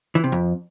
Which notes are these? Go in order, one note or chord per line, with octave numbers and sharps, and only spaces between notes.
E3
C3
F2